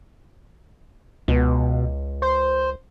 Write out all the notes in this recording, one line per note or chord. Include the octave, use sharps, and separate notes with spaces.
C#2 B2
C5